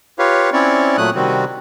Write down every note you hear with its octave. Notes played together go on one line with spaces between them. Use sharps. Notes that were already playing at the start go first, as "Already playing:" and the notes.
F4 G4 B4 C#5 F5
C4 C#4 E4 C#5 D5
A#2 F#3 A3 D#6 F#6
C3 D#3 G3 C4 F#4